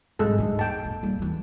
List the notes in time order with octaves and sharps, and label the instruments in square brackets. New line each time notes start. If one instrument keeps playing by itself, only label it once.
[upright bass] G#1 G3 [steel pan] G#3 A4
[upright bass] G#2 D3
[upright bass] D#2 [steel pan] G5 A5
[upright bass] A#1 F2
G3 A#3
D#2 E3